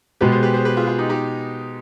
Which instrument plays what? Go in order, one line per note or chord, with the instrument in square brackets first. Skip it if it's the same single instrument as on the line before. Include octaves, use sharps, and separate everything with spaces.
[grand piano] B2 G#3 B3 [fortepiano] G4 B4
[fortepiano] G#4 C5
G4 B4
G#4 C5
G4 B4
F4 G#4
F4 G#4
D#4 G4
D#4 G4